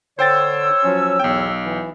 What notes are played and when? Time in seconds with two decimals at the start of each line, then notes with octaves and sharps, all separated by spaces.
0.19 D3 C5 C#5 G5 E6 A6
0.84 F3 F#3 C#4
1.19 B1 E2 G5
1.65 E3